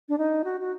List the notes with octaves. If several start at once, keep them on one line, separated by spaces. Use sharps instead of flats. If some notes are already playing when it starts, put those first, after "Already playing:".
D4
D#4
F#4
F#4